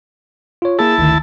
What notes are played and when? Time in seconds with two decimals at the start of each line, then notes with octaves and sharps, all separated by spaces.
0.62 F4 C#5
0.79 A#3 E4 G#4 A5
0.98 G1 D2 D#3